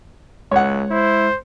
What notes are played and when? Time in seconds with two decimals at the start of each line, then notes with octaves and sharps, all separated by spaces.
0.51 C#2 G#3 C#5 F#5
0.91 E4 C5